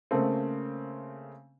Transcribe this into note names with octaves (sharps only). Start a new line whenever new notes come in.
C#3 A3 A#3 C4